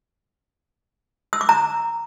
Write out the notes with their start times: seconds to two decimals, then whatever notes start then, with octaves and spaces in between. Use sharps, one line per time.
1.33 E6
1.41 D6
1.49 A#5